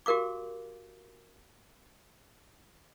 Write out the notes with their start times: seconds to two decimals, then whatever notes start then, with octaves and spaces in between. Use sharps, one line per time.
0.06 F#4 G4 A#4 F5 D6